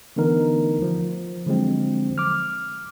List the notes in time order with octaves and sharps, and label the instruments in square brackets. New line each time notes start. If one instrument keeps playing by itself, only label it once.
[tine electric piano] D3 E3 A3 B3 D#4 A#4
F3
D3 F3 F#3 G#3 C4
D6 F6